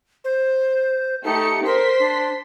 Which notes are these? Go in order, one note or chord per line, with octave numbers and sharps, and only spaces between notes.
C5
A3 D#4 G4 C#7
A#4 C5 C6 B6
D4